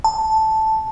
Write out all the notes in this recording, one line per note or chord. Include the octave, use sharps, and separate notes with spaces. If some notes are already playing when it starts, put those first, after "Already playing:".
A5